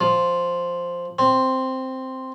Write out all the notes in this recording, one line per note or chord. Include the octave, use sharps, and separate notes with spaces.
F3
C4